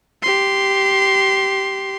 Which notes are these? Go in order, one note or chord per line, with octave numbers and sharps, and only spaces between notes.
G4 C6